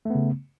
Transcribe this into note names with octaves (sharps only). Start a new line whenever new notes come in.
C#3 A3 B3